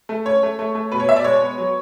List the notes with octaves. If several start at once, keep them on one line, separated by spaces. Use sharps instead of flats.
A3
C#4 C#5
A3
A3
A3
B2 B4
C#5
B2 E5
D5
G#3 C#5
B3
F#3